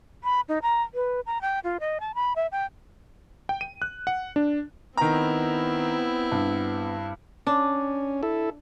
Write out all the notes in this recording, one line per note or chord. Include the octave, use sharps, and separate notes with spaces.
B5
D#4
A#5
B4
A#5
G5
F4
D#5
A5
B5
E5
G5
G5
D#7
F#6
F#5
D4
D#3 B3 C4 E4 A#5
G2
C#4 D4
E4 A4